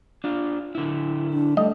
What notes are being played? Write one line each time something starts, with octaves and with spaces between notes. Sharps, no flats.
D4 F4
D3 E4
D4
G3 A3 D#5